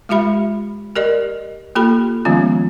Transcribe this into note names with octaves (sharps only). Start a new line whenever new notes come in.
G#3 F4 G4 E5 B5
G4 A#4 D5 D#5
A#3 F4 G4 A4 B5
D#3 F3 G#3 B3 C#4 F4